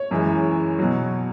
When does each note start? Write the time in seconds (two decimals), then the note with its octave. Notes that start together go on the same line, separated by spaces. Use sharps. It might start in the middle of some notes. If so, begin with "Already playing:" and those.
Already playing: C#5
0.11 F#2 E3 G#3
0.79 B2 F#3